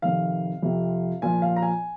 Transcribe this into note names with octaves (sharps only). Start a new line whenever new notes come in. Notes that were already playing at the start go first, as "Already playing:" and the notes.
F2 C3 D#3 F5
F2 C3 F3
A#2 F3 G#5
F5
A#5
G#5